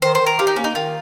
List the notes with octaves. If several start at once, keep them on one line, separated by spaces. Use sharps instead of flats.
D#3 C5
C5
D#3
A#4
F4 G4
D#4
A#3 C#4
D#4
D#3 F4